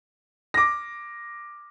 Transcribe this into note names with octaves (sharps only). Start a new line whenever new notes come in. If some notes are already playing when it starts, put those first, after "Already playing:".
D6 A#6